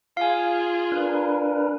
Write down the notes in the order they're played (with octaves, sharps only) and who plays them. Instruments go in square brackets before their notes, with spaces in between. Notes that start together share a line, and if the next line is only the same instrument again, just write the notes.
[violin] F4 G#4 [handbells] F5 G#5
[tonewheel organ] D4 A#4 B4